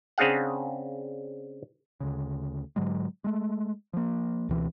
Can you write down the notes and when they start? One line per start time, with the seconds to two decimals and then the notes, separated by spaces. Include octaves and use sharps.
0.18 C#3 C4 D4 G#4 F5 F#5
2.00 D2 C#3
2.76 G#2 D3 F#3 G#3
3.24 G#3 A3
3.93 F3 A#3
4.49 C#2 B2 E3 C4